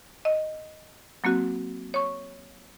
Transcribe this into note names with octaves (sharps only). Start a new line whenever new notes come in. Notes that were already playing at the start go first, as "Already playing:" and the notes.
D#5
F#3 A#3 C4 F#4
C#5 C#6